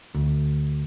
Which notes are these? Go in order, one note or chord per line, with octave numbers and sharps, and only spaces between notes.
D2